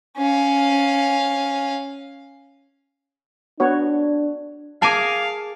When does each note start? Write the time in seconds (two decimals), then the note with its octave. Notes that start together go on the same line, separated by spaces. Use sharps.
0.17 C#4 F5
3.60 B3 D4 F#4 C#5
4.82 G#4 A#4 F5 G#5 A5 D6